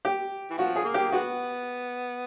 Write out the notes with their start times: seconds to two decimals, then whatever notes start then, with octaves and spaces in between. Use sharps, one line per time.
0.05 G4
0.51 E3
0.58 F3 F#4
0.76 G#4
0.85 A#3
0.94 G4
1.12 G#3 B3 F#4